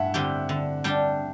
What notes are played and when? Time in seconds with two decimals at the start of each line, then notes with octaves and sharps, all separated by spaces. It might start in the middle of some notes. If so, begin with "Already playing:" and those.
Already playing: G2 E5 F#5
0.14 D3 G3 C4 G4
0.49 D3
0.84 G3 D4 G4